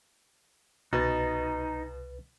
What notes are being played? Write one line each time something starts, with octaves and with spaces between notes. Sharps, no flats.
C2 B2 D#4 B4 A6